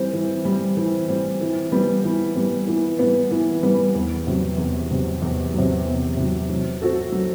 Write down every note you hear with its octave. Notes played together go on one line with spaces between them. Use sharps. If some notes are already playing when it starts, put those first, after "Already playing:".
Already playing: E3 G3 C4
E3
G3 C4
E3
G3 C4
E3
G3 B3
E3
G3 B3
E3
G3 B3
E3
G3 B3
E2
C3 F#3
E2
C3 F#3
E2
C3 F#3
E2
C3 F#3
F#3
C4 F#4 A4
F#3